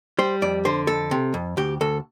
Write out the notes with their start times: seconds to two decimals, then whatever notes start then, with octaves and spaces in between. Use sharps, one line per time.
0.19 G3 C5
0.42 F2 D5
0.65 D3 C5
0.87 F2 A4
1.11 C3
1.34 F2
1.57 D2 G4
1.81 D2 A4